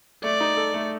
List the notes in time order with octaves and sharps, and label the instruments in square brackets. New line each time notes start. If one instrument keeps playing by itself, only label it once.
[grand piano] A3 [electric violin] D5
[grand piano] D#4
A4
A3